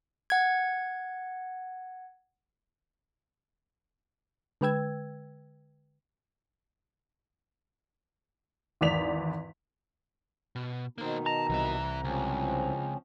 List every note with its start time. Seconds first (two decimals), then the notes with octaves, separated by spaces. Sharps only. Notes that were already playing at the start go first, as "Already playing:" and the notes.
0.30 F#5 G#6
4.61 D3 G#3 B4 G5 E6 G#6
8.81 G#1 E2 D5 B6 F7
10.55 B2
10.98 B2 D#3 A#3 D#4 C5
11.26 A5 A#5
11.49 C2 E3 E5
12.04 C#2 F3 C4 C#4